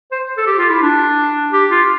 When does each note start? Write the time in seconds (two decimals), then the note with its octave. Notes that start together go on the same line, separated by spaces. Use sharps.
0.11 C5
0.37 A4
0.46 G4
0.58 F4
0.70 E4
0.82 D4
1.52 G4
1.70 F4